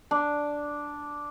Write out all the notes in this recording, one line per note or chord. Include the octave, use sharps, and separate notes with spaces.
D4